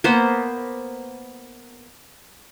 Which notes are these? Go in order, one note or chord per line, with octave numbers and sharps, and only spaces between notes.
A#3 B3 C5